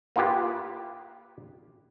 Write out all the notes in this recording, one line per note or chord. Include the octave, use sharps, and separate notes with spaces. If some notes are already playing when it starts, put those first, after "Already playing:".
A#3 E4 F4 G4 B4